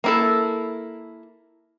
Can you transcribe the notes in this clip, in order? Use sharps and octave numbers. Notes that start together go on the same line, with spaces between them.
A#3 E4 A4